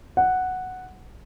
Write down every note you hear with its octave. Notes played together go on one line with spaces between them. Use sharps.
F#5